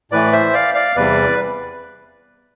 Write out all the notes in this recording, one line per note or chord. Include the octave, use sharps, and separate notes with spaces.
A2 E3 A3 B4 D5
C5 E5
D5 F5
D5 F5
E2 C3 G3 B4 D5